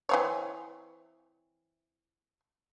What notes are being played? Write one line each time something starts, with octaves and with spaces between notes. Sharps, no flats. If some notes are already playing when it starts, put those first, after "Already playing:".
E3 C4 C#5